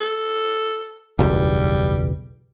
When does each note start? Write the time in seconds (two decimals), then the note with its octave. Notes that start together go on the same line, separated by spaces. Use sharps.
0.01 A4
1.19 F#1 B1 E2 G3